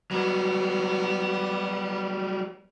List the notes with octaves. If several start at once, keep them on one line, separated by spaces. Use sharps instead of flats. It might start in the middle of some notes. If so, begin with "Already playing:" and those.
F#3 G3 B3